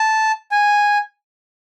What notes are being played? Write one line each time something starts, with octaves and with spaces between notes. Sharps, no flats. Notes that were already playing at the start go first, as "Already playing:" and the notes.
Already playing: A5
G#5